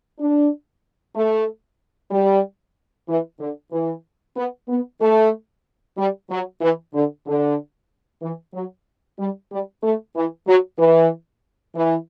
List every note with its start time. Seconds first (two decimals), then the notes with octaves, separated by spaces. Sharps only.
0.19 D4
1.15 A3
2.11 G3
3.08 E3
3.40 D3
3.72 E3
4.36 B3
4.68 B3
5.01 A3
5.97 G3
6.30 F#3
6.61 E3
6.94 D3
7.26 D3
8.22 E3
8.54 F#3
9.19 G3
9.51 G3
9.83 A3
10.15 E3
10.47 F#3
10.79 E3
11.75 E3